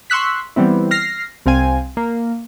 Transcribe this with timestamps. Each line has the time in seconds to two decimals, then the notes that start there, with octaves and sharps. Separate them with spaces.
0.10 C6 C#6 E6 F#6 B6
0.56 E3 G3 B3 C4 E4
0.91 F6 A#6 C7
1.46 C2 C4 F5 G#5
1.97 A#3